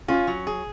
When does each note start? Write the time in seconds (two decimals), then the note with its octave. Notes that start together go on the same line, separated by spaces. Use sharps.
0.08 C#4 F4
0.27 F#3
0.47 G#4